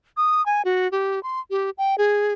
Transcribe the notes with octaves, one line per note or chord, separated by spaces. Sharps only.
D#6
G#5
F#4
G4
C6
G4
G5
G#4